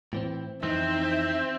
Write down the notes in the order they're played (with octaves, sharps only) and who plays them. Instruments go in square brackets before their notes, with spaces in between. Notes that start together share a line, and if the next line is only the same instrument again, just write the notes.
[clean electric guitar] A2 E3 C4
[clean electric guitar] F2 E3 [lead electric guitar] C4 [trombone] D#4 [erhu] E5